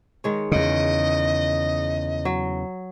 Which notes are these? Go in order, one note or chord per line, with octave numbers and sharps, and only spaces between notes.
D#3 G#3 C#5
E2 C#3 D#5
F#3